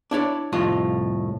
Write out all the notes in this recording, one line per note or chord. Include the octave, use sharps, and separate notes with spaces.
D4 E4 C#5 D5
C2 F2 A2 F4 D#5